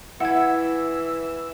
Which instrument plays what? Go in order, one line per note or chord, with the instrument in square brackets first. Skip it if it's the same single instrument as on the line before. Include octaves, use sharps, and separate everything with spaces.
[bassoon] E3 [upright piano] E4 [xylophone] F#5 G#6 [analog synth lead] E6